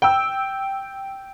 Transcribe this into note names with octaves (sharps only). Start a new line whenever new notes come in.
G5 E6